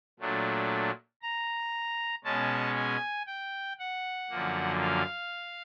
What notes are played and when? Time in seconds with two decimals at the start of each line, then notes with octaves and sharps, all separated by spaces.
0.19 A#2 F#3 A3 D4
1.22 A#5
2.24 B2 G#3 C#4 A5
2.76 G#5
3.27 G5
3.79 F#5
4.30 F#2 D3 F3 A#3
4.81 F5